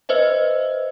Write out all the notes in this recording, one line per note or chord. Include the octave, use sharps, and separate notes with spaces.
B4 C5 D#5 E5